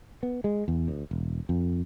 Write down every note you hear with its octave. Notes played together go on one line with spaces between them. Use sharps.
B3
G#3
E2
D2
E1
F2